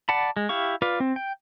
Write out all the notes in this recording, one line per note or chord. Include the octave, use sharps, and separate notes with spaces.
D5 F#5 A5 B5
G#3
E4 G4 F5 C#6
F4 B4 D5 F5
C4
G5